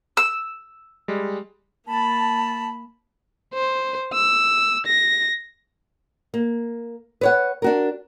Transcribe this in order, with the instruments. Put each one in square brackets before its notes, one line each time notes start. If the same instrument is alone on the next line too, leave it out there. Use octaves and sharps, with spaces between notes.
[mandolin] E6
[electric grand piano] G3 G#3
[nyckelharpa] A#3 B5 [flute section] A5
[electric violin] C5
E6
A#6
[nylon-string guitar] A#3
B4 C#5 F#5
D4 F#4 A#4